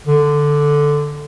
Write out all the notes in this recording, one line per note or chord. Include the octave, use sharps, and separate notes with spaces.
D3